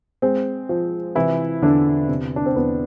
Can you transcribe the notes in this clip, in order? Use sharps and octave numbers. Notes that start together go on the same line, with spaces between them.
G#3 C4
F3
C3 E3 E4
E2 D3 D4
C3
D4
C4
E2 B3